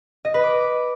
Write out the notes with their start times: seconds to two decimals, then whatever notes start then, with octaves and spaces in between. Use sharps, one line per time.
0.25 D#5
0.34 B4
0.44 D6